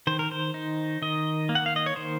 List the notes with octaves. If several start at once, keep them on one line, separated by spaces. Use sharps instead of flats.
D#3 C5
A#4
C5
D#4
D#3 D#5
A#3
F#5
F5
D#5
C#5
D#3 C5